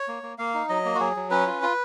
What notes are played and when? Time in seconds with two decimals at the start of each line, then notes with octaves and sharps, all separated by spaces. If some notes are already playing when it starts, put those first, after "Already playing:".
Already playing: C#5
0.08 A#3
0.23 A#3
0.38 A#3 F5
0.54 D#4
0.69 F#3 D#5
0.85 A#3
0.95 F#4
1.00 F#3 G#4
1.16 F#3
1.31 C#4 B4
1.47 F4
1.63 F4